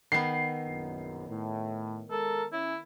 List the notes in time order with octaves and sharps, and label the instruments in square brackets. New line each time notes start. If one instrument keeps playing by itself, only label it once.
[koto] D#3 B3 [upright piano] C7
[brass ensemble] A#1 F#2
A2
[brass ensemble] G#3 A#4 [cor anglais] A4
[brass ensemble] C#4 [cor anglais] E4